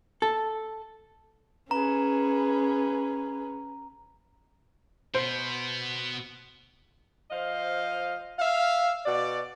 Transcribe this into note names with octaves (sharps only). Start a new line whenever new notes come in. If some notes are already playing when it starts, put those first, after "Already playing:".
A4
C#4 G#4 B4 A#5
B2 B3 C5
F3 C5 D#5 F5
E5 F5
B2 F#4 D5